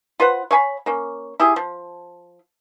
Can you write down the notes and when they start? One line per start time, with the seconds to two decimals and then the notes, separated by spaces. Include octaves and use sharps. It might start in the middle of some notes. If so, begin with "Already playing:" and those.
0.20 F4 B4 C5 F#5
0.51 C#5 F5 G#5 B5
0.86 A#3 C#4
1.40 E4 G4 G#4
1.56 F3